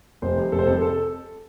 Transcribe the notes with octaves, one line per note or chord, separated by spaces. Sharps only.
F1 C5
F2 C3
F1 A4
C5
F2 C3 A4
A4